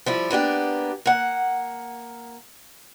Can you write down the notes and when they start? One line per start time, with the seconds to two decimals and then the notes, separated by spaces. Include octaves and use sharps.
0.06 F3 G3 E4
0.31 A#3 B3 D4 G4
1.06 A#3 F#5